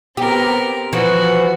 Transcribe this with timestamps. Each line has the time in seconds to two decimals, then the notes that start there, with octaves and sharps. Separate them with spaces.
0.17 B3 C4 G4 A#4
0.93 E3 F3 F#4